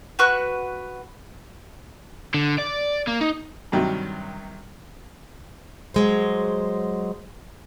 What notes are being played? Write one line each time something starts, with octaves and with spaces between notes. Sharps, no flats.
F#4 B4 C#6 F#6
D3
D5
A#3
D#4
G2 C3 D#3 F#3
F#3 G#3 C5